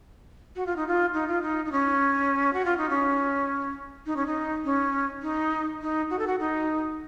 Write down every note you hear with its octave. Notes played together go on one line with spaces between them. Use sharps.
F#4
F4
D#4
F4
D#4
F4
D#4
D#4
C#4
F#4
F4
D#4
C#4
D#4
C#4
D#4
C#4
D#4
D#4
F#4
A4
F#4
D#4